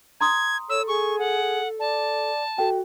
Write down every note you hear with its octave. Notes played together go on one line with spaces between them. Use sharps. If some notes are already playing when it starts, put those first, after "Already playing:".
A#5 C6 D#6 G#6
A4 C#5 E6
G#4 C#6
F#5
D5 A5
F#4 A4 G5